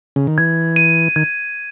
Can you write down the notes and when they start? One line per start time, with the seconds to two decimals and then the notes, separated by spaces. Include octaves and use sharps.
0.16 C#3
0.27 D#3
0.38 E3 G#6
0.76 D#7
1.16 D#3 G#6